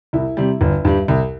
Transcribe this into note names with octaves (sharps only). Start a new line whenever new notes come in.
C2 E4
C3 G3
G1
G2 G3
C2